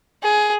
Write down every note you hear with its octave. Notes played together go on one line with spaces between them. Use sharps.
G#4